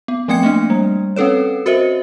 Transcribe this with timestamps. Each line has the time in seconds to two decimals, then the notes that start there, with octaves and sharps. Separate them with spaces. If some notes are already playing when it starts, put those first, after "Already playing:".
0.08 B3
0.28 F3 A3 C4 G5 G#6 C#7
0.43 A3 A#3 D4
0.70 G3
1.16 C4 C#4 A4 B4 C#5
1.66 F#4 A#4 C5 D#5 E5